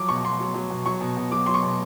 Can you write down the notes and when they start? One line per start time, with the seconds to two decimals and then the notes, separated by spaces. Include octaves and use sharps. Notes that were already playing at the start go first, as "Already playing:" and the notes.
Already playing: F3 F#3 D6
0.08 B2 C#6
0.24 B2 C6
0.39 F#3
0.54 F#3
0.70 B2
0.85 F#3 C#6
1.01 B2
1.17 B2
1.31 F#3 D6
1.46 F#3 C6
1.54 C#6
1.63 B2